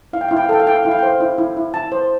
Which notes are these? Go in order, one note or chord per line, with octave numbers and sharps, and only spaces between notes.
E4 F5
G5
E4 F5
G5
F5
A4 G5
F5
E4 G5
F5
E4 G5
F5
G5
C5 F5
E4
E4
E4
E4 A5
C5